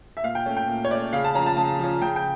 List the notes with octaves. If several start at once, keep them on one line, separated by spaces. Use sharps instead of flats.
E5
A#2 F5
G5
A3 C#4
G5
A#2
C#5
A3 C#4 D5
C#3 F5
A5
F3 C#4 A#5
A5
C#3 A5
F3
C#4
C#3 G5
G5